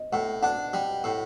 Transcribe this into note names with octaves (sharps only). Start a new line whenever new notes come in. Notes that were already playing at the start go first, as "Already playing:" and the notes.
Already playing: D#5
A2 F#5
D4 F#5
G3
A2